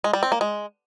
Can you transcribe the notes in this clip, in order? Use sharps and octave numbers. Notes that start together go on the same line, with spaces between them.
G#3
G3
C4
A#3
G#3